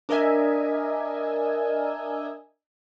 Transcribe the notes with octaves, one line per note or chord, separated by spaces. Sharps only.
D4 A#4 D#5 E5 G#5